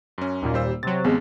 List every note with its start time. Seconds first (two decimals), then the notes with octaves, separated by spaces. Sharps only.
0.18 F#2 C#4
0.42 D#2 A#2
0.54 G3 C5 E6
0.83 C3 F#3 A6
1.04 A1 G#3 B3 C4 G#4